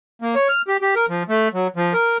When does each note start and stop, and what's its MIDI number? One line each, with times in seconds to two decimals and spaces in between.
0.22 0.35 58
0.35 0.48 73
0.49 0.62 89
0.68 0.77 67
0.82 0.94 67
0.96 1.06 70
1.09 1.23 53
1.29 1.48 57
1.54 1.67 54
1.76 1.93 53
1.93 2.17 70